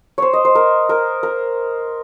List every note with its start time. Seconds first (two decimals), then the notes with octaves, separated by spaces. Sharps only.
0.18 C5 C#5
0.33 D#5
0.45 C5
0.55 A#4
0.89 A#4
1.23 A#4